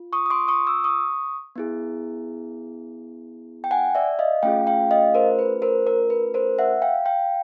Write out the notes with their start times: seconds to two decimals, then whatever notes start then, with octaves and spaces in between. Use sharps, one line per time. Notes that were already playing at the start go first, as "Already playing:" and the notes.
Already playing: F4
0.13 C#6 D#6
0.26 D#6
0.30 C6 D6
0.48 C#6 D#6
0.67 D6 E6
0.84 C#6 D#6
1.56 B3 E4 G#4
3.64 G5
3.71 F#5 G#5
3.95 D5 E5
4.19 D#5 F5
4.43 A3 C#4 F4 G#4 F5 G5
4.67 F5 G5
4.91 D#5 F5
5.14 A#4 C5
5.39 B4
5.62 A#4 C5
5.87 A#4
6.10 B4
6.34 A#4 C5
6.59 E5 F#5
6.82 F5 G5
7.06 F5 G5